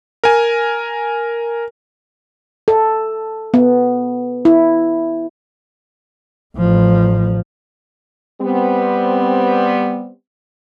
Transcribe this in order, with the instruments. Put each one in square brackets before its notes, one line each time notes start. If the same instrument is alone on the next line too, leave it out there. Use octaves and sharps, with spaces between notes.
[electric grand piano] A#4 G#5
[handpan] A4
B3
E4
[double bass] A1 F3
[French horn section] G3 B3 C4